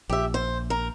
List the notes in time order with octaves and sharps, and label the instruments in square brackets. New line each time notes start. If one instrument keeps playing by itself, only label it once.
[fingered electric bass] A#1 [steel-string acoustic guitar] G4 E5
[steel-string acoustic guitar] C5
A#4